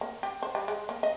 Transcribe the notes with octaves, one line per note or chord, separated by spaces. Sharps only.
A#3
G4
C5
G3
G#3
A#3
D#5